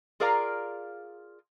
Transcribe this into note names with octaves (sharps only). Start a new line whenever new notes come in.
F4 G#4 A#4 D5 F5 A#5